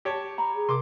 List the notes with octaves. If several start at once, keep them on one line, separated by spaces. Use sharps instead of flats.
G4 C#5 A5
A#5 B5
G#4
C3 C6 D6